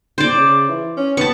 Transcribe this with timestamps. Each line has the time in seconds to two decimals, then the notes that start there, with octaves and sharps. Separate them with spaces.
0.18 C5 D5
0.35 C#3
0.69 E3
0.97 C#4
1.17 B3 A5 C#6